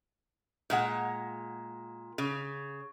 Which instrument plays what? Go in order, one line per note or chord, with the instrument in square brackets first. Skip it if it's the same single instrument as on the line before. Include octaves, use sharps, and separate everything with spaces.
[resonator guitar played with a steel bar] A#2 G#3 F#5
C#3